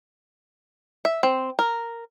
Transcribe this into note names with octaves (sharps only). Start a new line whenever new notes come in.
E5
C4
A#4